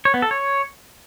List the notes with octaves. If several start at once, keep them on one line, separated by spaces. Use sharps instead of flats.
C#5
B3
A4
C#5